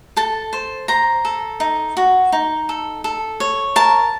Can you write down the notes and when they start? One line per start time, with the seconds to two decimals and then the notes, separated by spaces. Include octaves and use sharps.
0.17 A4 A5
0.53 C5
0.88 C5 A#5
1.25 A4
1.60 D#4
1.97 F#4
2.32 D#4
2.69 A4
3.04 A4
3.40 C#5
3.76 A#4 A5